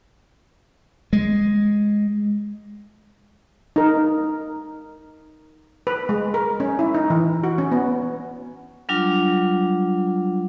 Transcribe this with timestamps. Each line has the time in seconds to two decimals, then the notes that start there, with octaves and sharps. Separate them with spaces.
1.13 G#3
3.76 D#4 A#4
5.87 B4
6.09 G#3
6.34 A#4
6.60 C#4
6.79 E4
6.95 D#4
7.10 E3
7.44 F#4
7.58 C#4
7.72 B3
8.89 F#3 G3 D4 F4